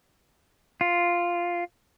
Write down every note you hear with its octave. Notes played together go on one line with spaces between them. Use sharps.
F4